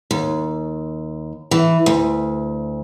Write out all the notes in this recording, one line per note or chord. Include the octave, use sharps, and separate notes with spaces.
D#2
E3
D2